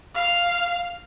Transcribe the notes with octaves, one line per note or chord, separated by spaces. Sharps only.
F5